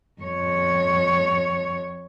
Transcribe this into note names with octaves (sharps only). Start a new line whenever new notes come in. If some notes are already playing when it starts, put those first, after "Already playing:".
F2 C#5